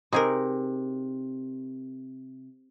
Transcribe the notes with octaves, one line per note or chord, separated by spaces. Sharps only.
C3 D#4 G#4 A#4